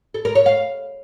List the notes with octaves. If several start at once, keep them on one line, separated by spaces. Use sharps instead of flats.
A4
A#4
C#5
F5